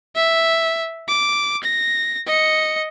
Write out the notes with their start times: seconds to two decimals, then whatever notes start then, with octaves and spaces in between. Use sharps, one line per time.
0.16 E5
1.08 D6
1.63 A#6
2.27 D#5 C#7